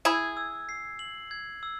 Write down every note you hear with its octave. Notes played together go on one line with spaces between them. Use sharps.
E4 G#4 G#6
E6
C7
F#7
G#6
E6